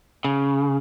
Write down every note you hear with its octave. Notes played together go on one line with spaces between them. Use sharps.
C#3